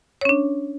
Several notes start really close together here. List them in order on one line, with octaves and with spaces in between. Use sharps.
C#5 C#4 D4